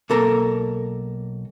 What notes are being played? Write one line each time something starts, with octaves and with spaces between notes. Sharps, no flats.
B1 A#3 A4 A#4 A#5